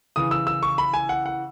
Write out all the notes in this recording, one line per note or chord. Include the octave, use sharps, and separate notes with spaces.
C#3 E3 D#6
E6
E6
C#6
B5
G#5
F#5
F#5